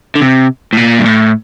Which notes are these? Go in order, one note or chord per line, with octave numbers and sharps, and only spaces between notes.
D3
C3
A2
A#2
G2
A2